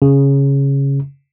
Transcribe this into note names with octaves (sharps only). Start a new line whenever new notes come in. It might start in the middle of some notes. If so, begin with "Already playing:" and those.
C#3